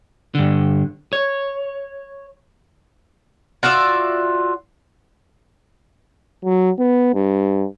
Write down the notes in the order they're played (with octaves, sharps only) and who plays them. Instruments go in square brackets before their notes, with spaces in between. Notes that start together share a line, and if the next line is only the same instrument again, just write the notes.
[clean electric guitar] G2 D3
C#5
[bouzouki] F4 F#4 D5 E5
[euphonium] F#3
B3
G2